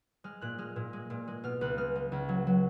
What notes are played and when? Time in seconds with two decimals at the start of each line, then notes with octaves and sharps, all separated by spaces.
0.24 G#3 F6
0.41 A#2 F#6
0.59 G#3 F6
0.76 A#2
0.93 G#3
1.10 A#2
1.28 G#3
1.44 B2 F6
1.61 C#2 F#6
1.78 G#3 F6
1.96 G#3
2.12 C#2
2.29 F#3
2.47 F#3